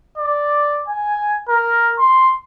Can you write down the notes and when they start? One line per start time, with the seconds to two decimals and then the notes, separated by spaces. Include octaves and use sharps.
0.18 D5
0.88 G#5
1.49 A#4
1.99 C6